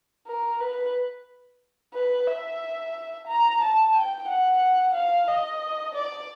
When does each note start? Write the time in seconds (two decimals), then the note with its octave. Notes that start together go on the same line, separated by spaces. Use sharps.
0.27 A#4
0.60 B4
1.95 B4
2.27 E5
3.27 A#5
3.61 A5
3.95 G5
4.29 F#5
4.94 F5
5.28 D#5
5.94 D5